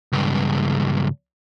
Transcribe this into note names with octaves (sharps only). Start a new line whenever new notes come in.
C#2 G2